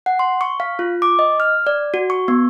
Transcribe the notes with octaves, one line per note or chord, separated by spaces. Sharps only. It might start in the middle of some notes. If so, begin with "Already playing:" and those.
F#5
C6
C#6
F5
F4
D6
D#5
F6
D5
F#4
C#6
B3